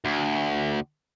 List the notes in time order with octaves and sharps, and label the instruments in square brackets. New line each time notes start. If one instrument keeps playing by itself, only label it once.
[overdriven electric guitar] D2